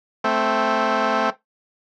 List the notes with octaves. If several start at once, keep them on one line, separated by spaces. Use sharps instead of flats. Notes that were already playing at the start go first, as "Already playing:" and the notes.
A3 C4